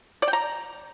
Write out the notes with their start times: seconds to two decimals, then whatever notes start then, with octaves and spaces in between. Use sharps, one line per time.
0.22 D5
0.28 G5
0.33 A#5